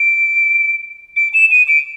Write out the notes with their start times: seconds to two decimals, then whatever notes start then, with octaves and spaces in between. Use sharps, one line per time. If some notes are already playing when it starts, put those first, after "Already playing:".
Already playing: D7
1.16 D7
1.34 E7
1.51 D#7
1.68 D7